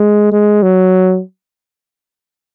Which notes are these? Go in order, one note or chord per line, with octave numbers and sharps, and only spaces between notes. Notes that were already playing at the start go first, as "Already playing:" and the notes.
Already playing: G#3
G#3
F#3